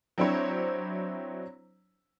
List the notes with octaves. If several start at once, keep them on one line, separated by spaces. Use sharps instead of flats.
F#3 C4 D4 E4 C5 C#5